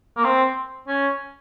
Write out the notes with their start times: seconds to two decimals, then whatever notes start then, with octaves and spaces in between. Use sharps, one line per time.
0.17 A#3
0.24 C4
0.88 C#4